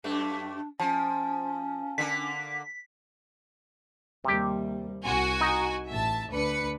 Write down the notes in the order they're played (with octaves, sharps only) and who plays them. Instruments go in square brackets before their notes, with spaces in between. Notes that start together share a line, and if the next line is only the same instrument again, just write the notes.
[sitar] F#2 A3 [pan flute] D4
[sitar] F3 [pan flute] C#4 [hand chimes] A5
[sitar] D3 A#3 [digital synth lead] B6
[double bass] D#2 G3 [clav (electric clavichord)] C3 G4
[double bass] C2 [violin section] F#4 G#5
[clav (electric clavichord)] D#4
[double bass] A1 [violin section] E5 A5
[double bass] D2 D4 [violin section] B4 C#7